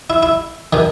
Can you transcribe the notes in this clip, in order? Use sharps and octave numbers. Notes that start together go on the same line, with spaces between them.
E4
E4
B2 D#3